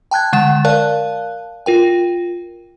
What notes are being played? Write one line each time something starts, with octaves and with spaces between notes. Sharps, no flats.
G5 A5 F#6 G#6
D3 G#3 F#5 A6 E7
A#4 D5 F5 A5 F#6
F4 A#4 G5